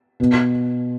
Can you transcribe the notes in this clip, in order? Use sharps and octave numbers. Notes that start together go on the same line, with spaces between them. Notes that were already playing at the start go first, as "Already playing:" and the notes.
B2